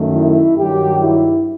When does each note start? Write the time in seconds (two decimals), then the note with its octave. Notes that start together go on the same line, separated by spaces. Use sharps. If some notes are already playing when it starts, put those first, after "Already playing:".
Already playing: F#2 D#3 A3
0.14 E4
0.57 G2 D#3 F#3 G4
1.01 E4